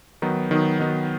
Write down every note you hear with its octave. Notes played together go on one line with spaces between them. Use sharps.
D#3 F#3 B3 D#4
D#3 F#3 B3 D#4
D#3 F#3 B3 D#4